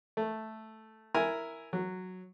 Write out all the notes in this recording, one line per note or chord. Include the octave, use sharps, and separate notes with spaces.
A3
E4 A#4 G#5 A#5
F#3